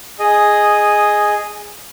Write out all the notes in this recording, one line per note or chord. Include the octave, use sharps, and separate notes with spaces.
G#4 D#5